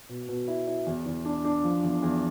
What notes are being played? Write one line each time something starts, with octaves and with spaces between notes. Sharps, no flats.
B2
B2
E4
E4
E2
E2
D4
D4
F3
E2
E2